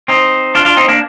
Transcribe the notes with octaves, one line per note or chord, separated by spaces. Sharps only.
C4 D#4
D4 F4
D4 F4
C4 D#4
A#3 D4